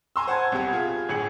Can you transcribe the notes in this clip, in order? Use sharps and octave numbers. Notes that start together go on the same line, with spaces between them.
G#5 A#5 C6 E6
C5 F#5 G#5 A5 G#6
C2 B3 G4 G#6
F4 G#4
G1 A2 G#4 C#7 F#7